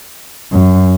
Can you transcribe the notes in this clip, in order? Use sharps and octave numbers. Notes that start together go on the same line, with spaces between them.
F#2